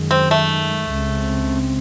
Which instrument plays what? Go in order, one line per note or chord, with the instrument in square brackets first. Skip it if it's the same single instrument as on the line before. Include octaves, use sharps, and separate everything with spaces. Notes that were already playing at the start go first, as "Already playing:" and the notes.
Already playing: [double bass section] F#2 D#3 G#3
[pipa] C4
A3
[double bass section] C#2 C#3 G#3 C4